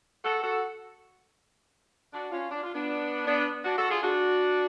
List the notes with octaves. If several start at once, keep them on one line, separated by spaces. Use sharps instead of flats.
F#4 A4
F#4 A4
D4 F#4
C#4 F4
D4
F4
B3 D4
B3 D4
D4 F#4
F#4 A4
F4 G#4
D4 F#4